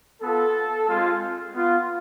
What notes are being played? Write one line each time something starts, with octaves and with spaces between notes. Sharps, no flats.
B3 F4 A4
G#3 C4 F4
B3 F4